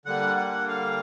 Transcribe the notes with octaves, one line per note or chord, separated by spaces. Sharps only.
D3 G3 A#3 F#5
F#5
F5